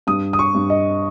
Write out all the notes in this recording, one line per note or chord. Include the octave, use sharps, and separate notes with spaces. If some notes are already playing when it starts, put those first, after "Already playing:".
G2 D#6
D#6
C#6
G2
D#5